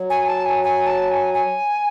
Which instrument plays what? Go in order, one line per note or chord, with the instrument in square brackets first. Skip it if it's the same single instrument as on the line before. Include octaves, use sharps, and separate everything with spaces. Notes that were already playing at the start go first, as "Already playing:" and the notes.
Already playing: [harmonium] F#3
[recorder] G#5
A5
G#5
G#5
A5
G#5
G#5